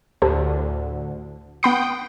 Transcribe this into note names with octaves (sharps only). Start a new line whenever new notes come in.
D2 A2 D3 G4 A4 C5
B3 F#5 G5 B5 D#6 C7